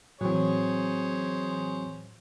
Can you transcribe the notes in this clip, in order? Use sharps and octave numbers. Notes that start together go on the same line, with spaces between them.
A2 E3 F#3 C4 G#4 C5 C#5